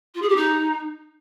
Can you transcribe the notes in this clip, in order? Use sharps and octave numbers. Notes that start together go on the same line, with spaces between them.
F4
G#4
G4
D#4